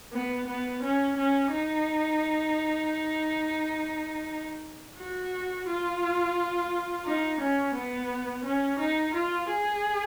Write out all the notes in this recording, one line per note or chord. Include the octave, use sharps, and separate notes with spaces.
B3
B3
C#4
C#4
D#4
F#4
F4
D#4
C#4
B3
C#4
D#4
F4
G#4